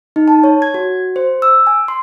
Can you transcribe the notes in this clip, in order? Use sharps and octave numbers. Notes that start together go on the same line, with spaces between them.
D#4
A5
C#5
G#6
F#4
C5
E6
G#5
C6